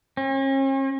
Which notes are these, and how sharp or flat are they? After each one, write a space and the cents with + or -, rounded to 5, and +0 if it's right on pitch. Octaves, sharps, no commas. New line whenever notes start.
C#4 -45